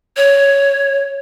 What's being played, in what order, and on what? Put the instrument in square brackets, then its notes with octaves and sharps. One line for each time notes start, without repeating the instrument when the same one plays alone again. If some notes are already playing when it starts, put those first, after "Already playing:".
[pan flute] C#5